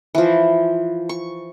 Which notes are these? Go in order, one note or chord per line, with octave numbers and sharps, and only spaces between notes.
E3 F3
C#6